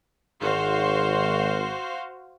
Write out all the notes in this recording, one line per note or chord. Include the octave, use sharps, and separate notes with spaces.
G#1 F#4 C5 F5